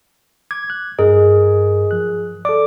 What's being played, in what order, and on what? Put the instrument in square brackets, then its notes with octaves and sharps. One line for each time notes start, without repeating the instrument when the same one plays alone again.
[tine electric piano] D6 [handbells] G#6
[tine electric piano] F#6
[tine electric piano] G2 A#4 D#5 [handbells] G#4
[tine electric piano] F3 F#6
[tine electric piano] A4 D5 [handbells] D6